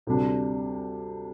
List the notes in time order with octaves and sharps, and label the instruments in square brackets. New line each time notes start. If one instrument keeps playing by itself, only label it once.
[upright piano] D2 C3 G3 D4